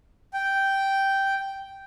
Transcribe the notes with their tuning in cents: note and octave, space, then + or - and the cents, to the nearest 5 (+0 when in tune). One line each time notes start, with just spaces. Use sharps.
G5 -5